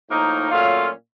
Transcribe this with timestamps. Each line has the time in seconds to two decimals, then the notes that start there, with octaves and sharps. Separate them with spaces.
0.09 A2 F3 A#3 D#4
0.50 A#2 F#3 A3 C#4 F4 F5